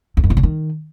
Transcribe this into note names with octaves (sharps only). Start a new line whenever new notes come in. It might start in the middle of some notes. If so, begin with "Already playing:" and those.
E2
F#2
D#3
C#3
D#3